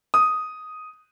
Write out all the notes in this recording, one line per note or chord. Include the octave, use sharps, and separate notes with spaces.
D#6